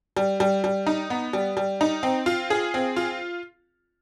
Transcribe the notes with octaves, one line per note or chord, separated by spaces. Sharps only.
G3
G3
G3
D#4
B3
G3
G3
D#4
C4
F4
G#4
C4
F4